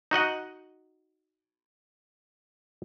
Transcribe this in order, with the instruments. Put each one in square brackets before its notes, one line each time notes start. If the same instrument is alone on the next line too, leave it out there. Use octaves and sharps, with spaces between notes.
[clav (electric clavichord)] D#4 F#4 D#5 F#5